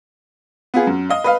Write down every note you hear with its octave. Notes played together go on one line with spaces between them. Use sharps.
B3 F4 G#4
F#2
D#5 F5
B4 D#5 F5